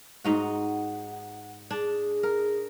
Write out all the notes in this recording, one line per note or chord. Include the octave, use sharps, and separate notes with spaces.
G#2 A3 D#4 F#4
F#5
D4 G#4
A#4